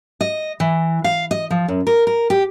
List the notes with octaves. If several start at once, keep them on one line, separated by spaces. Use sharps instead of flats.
D#5
E3
F5
D#5
F3
F#2
A#4
A#4
G4